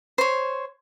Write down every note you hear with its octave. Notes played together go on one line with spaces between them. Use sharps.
C5 C#5